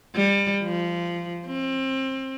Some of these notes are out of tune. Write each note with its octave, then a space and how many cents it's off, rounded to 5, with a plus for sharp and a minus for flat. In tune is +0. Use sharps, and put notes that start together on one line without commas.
G3 +25
F3 -15
C4 +25